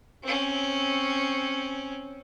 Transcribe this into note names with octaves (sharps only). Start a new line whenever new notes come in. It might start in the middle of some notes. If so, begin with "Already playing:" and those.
C4 C#4